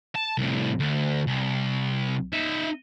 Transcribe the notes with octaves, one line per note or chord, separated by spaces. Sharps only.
A5
C2 A2
D2
C2
D#4 E5